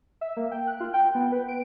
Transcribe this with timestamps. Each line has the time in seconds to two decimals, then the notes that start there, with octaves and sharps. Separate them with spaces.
0.21 E5
0.37 A#3
0.51 G5
0.67 F#6
0.80 F4
0.93 G5
1.15 B3
1.32 B4
1.48 D7